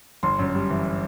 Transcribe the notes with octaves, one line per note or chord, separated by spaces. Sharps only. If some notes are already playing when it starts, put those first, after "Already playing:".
G1 C6
F#2
G3
E3